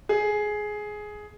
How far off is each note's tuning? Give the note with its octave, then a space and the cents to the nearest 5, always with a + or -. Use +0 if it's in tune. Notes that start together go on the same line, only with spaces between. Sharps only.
G#4 +10